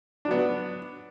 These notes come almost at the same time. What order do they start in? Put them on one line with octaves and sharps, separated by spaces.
D4 F#3 B3